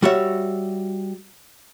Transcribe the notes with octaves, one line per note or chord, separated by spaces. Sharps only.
G3 F#4 C#5 E5